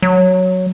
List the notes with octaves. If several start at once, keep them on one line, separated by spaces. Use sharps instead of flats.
F#3